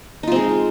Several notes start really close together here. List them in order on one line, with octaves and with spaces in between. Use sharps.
D#4 F4 C4 G#3